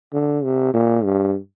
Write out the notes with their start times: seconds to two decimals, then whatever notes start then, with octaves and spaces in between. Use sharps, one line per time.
0.13 D3
0.44 C3
0.74 A#2
1.04 G2